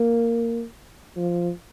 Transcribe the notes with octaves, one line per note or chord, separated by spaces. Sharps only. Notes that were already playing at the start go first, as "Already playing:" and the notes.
Already playing: A#3
F3